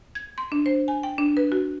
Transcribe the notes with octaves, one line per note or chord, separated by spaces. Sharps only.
G#6
C6
D4
C5
G#5
G5
D4
B4
F#4